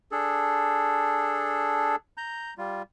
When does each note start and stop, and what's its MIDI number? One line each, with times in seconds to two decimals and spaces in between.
0.12 1.96 62
0.12 1.96 68
0.12 1.96 69
2.17 2.54 82
2.17 2.54 91
2.58 2.82 55
2.58 2.82 65